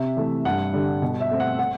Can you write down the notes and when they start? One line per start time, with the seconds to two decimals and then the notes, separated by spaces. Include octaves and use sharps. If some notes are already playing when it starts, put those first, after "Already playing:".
Already playing: C3 E5
0.17 E3 A3
0.45 G2 F#5
0.73 D3 G3
1.02 B2
1.20 E5
1.31 A3 C4
1.40 F#5
1.59 F#5